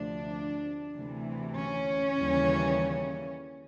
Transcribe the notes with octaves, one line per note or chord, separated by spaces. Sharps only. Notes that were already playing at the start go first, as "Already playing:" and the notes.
Already playing: D2 C3 F3 A3 D4
D2 C3 E3 A3
C#4
D#2 C#3 E3 G3